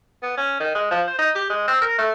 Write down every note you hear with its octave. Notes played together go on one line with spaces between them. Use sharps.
B3
C#4
D#3
G#3
F3
C5
D#4
G4
G#3
C4
A#4
A3